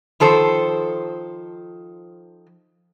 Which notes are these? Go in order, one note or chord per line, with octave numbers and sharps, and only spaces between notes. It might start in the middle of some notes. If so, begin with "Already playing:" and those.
D#3 F3 A4 C5